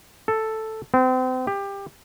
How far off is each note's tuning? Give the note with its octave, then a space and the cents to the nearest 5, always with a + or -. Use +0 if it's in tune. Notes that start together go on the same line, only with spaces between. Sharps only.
A4 +0
C4 -35
G4 +20